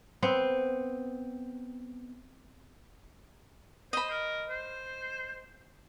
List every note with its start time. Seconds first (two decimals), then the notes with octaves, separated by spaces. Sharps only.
0.22 B3 C4
3.93 C5 D#5 B5
4.10 A#4
4.49 C5